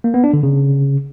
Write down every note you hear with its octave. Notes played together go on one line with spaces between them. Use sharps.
A#3
B3
D4
D3
C#3